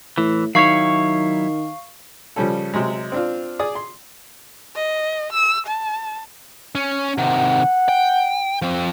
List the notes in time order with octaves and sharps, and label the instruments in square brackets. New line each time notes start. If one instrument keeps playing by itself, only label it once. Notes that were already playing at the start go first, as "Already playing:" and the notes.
[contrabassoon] A2 [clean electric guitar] E3
[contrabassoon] D#3 [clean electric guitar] F#3 E4 C#5 [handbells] F5 C#6
[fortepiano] C#3 F3 G3 C#4 A4
C3 F#3 G#3
C4 D4 F4
G#4 D5 D#6
C6
[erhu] D#5
E6
A5
[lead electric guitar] C#4
[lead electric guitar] C3 D#3 [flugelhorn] F#5
[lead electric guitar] G5
F3 C4